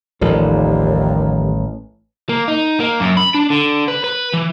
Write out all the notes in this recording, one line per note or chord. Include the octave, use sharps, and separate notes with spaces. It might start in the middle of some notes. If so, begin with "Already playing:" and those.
A1 D#2 D#3 F3 G3 A4
A#3
D#4
A#3
F#2
B5
D4
D3
B4
B4
E3